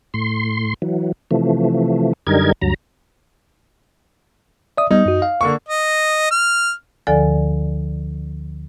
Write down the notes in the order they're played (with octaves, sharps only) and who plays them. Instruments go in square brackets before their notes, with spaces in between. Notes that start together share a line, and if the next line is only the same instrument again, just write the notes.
[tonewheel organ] A2 C6
E3 F#3
C3 E3 F3 A3
F#2 D3 G3 D#4 A#4 G#6
D2 G2 F#3 A#5
[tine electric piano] D5 E5 D#6
[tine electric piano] G3 B3 [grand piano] D#4
[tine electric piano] F#2 F#4
F5
[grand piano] D3 A#3 C#6
[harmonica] D#5
F6
[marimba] D2 D3 F3 A4 D5 G#5